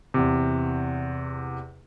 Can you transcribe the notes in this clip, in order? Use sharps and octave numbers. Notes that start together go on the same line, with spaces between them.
E2 C3